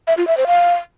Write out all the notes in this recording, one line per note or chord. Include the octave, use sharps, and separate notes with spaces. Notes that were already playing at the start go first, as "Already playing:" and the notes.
E5
F4
E5
C5
F5